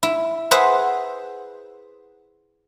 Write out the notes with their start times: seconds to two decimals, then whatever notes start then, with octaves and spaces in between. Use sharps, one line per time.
0.03 E4
0.51 G#4 B4 C5 E5 F#5